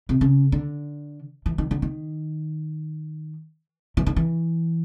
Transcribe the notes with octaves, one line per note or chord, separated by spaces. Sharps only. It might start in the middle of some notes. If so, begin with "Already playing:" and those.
C3
C#3
D3
E3
D#3
D3
D#3
E3
D#3
E3